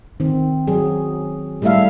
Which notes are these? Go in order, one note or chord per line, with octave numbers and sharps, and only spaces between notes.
D#3 C4
F#3 G#4
G3 A3 E4 A4 E5 F5